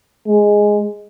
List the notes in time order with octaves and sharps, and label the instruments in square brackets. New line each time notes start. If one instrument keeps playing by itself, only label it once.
[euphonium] G#3